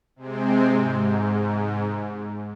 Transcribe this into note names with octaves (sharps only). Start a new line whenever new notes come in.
C3 G#3 C4
G#2